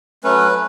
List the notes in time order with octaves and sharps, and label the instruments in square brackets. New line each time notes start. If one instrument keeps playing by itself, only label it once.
[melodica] F#3 A3 C#4 B4